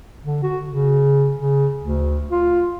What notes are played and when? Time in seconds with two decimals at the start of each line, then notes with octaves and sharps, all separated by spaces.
0.24 D3
0.43 F#4
0.70 C#3
1.35 C#3
1.80 D2
2.31 F4